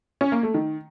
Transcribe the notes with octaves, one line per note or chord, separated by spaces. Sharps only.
C#4
A#3
A3
D#3